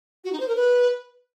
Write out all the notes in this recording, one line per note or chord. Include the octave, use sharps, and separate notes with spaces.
F#4
D#4
C5
A#4
B4